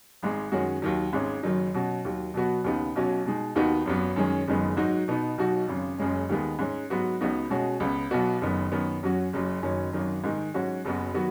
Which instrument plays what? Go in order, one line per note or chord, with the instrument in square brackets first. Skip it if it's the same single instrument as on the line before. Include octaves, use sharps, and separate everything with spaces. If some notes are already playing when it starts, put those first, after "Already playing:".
[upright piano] G#1 G#2 G#3
F#2 D#3 G#3 C#4 F#4
D#2 D#3 F#3
G#1 G#2 G#3 C#4
F#1 F#2 D#3 F#3 D#4
B2 F#3 C#4 F#4
D#2 D#3 F#3
B2 F#3 B3 F#4
D#2 C#3 B3 D#4
B1 B2 F#3 C#4 F#4
B2 G#3 D#4
D#2 D#3 B3 D#4 F#4
G#1 F#2 F#3 B3
F#2 D#3 G#3 C#4
F#1 F#2 D#3 G#3 B3
G#2 F#3 D#4 F#4
B2 B3 D#4
B1 B2 F#3 D#4 F#4
G#1 F#2 C#3
F#1 F#2 C#3 G#3 C#4
D#2 D#3 G#3 B3
G#2 G#3 C#4
G#2 F#3 B3 F#4
C#2 C#3 B3 D#4 F#4
B2 G#3 C#4 F#4
C#2 C#3 B3
B1 B2 B3 F#4
F#1 F#2 D#3 B3
F#2 D#3 B3
F#2 F#3 C#4 F#4
F#1 F#2 F#3
F#1 F#2 D#3 F#3 C#4
G#1 F#2 D#3 F#3
G#2 D#3 G#3 D#4
G#2 F#3 C#4 F#4
F#1 F#2 F#3 B3 F#4
D#3 F#3 B3 F#4